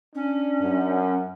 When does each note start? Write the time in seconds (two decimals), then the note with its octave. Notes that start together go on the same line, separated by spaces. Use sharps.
0.15 C#4 D4
0.59 F#2